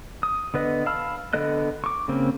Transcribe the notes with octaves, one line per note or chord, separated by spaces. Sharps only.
D#6
D3 B3 B4 D#5
F5 A5 B5 E6 F6
D3 B3 A4 D#5 F#6
C#6 D6
C#3 A#3 C4